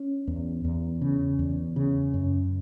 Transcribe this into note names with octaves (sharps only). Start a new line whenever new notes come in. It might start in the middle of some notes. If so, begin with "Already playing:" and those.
Already playing: C#4
E2
E2
C#3
E2
C#3
F#2